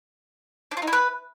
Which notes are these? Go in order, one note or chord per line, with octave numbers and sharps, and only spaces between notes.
D4
F4
D#4
E4
B4